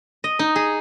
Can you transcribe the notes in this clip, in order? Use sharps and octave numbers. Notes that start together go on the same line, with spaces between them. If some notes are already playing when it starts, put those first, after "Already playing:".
D#5
D#4
G#4